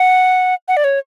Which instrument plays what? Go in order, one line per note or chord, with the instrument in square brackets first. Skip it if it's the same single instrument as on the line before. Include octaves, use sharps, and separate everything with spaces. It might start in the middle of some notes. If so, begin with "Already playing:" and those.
Already playing: [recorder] F#5
F#5
D5
C#5